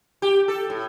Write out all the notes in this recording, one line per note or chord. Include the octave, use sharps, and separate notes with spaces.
G4
A4
A2